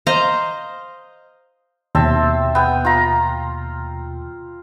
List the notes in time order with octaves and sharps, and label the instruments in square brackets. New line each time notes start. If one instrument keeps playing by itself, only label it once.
[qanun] C5 D#5 F5 A#5
[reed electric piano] D#2 B2 [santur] C4 E5 A5
[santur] B3 G5
F4 A#5